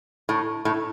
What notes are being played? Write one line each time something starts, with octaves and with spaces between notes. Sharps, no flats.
A2
A2